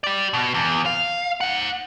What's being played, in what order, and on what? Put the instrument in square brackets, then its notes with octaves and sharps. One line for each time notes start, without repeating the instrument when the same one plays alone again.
[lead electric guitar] G4 D5
B2
E2
F5
D#4 F#5